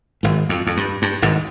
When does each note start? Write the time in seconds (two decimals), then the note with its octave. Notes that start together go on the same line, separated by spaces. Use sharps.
0.23 G#1 G#2
0.49 F2
0.67 F2
0.77 G2
1.02 G2
1.22 G#1 G#2